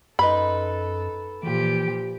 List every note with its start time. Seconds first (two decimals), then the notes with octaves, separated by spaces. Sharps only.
0.19 F#2 D#4 A4 B4 B5 C6
1.43 A#2 E3 F3 G4